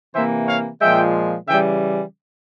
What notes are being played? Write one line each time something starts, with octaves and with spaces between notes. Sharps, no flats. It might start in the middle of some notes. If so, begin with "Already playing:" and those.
C3 E3 A#3 C5 E5
C#5 F5
A#2 F3 G#3 E5 G5
C#3 E3 G3 E5 G5